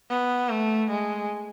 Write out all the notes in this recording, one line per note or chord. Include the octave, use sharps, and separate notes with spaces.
B3
A3
G#3